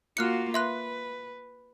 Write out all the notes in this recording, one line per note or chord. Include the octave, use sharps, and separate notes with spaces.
A#3 F4 F#4 F6 F#6 C#7
B4 E5 C6 F#6